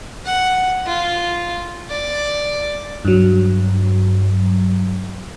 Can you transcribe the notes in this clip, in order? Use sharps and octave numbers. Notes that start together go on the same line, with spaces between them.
F#5
F4
D5
G2 F#3